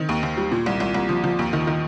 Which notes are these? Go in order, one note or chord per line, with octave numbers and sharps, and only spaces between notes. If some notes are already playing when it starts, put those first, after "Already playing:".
Already playing: D#3 C4
D#2
D#2
G3
A#2
C2
C2
C2
F3
F3
D#2
D#3
D#3